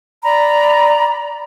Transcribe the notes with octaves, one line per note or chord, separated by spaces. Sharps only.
D5 A#5 B5